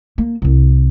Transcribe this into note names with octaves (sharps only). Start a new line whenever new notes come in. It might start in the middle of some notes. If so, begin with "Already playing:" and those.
A#3
C2 C3